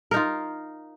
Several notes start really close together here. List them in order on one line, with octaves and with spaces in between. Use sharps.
A#4 D#4 F4